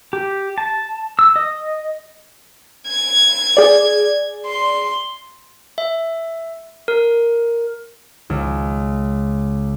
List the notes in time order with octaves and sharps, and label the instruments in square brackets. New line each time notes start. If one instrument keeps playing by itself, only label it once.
[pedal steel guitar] G4
A5
E6
D#5
[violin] G#6
[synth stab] G#4 D5
[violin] C6
[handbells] E5
A#4
[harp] C#2